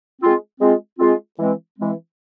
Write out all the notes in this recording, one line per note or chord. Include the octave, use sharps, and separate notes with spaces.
G#3 C4 F4
G#3 C4 F4
G#3 C4 F4
E3 G#3 C4
E3 G#3 C4